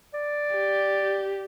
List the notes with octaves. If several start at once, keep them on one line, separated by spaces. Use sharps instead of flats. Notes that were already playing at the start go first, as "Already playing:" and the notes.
D5
G4